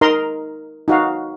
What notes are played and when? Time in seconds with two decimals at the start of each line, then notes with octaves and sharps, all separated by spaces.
0.01 D#4 A#4 D#5 A#5 C6
0.88 D#4 F#4 F5